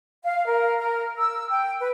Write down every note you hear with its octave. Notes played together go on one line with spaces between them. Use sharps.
F5
A#4
A#4
E6
G5
B4